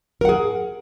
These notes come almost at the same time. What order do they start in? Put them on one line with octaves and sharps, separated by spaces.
A#4 F#5 G#4